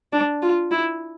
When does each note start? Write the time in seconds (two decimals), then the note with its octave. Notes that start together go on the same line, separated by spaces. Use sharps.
0.12 D4
0.42 F4
0.71 E4